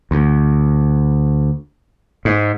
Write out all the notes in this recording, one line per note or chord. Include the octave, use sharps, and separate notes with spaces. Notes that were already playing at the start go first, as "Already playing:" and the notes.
D2
G#2